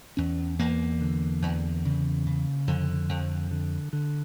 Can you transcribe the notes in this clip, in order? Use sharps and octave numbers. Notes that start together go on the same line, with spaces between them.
E2 C#4
E2 A#3
D3
E2
C#3
C#3
F2 D3
F2
D3
D3